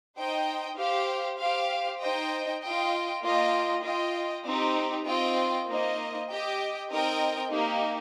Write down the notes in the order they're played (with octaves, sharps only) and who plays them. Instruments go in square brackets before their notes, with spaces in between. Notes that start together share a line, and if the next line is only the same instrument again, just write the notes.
[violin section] D#4 C5 D#5 G5
G4 C5 F5
G4 C5 F5
D#4 C5 D#5 G5
F4 D#5 G5
A#3 F4 D#5 G5
F4 D#5 G5
C4 D#4 G4
C4 F4 D#5 G5
A#3 D#4 C5 D#5
G4 D#5 G5
C4 D#4 A#4 D#5 G5
A#3 D#4 G4